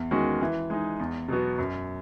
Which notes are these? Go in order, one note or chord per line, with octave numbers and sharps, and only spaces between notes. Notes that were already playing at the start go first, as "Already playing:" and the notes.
Already playing: E2
D#3 G#3 C#4 F#4
E3
G#3 D#4
E2
B2 F#3 B3 F#4
F#2